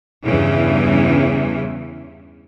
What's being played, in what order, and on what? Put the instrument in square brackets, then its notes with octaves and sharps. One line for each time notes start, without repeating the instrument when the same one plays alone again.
[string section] E2 G2 C#3 E3